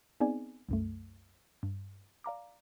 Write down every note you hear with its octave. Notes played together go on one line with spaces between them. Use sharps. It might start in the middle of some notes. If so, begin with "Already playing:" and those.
B3 C4 D#4 G#4 D5 G#5
C2 F#2 A3
G2
D5 F5 A#5 D6